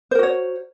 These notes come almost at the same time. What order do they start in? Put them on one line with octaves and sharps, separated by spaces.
C5 A#4 F#4 C#5